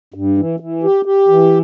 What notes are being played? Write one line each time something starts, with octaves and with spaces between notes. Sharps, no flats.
G2
E3
E3
G4
G4
E3